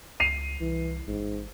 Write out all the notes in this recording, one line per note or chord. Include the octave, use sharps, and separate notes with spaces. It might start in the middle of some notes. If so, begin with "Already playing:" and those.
C#2 C7 D#7 F7
C2 E3
A1 G#2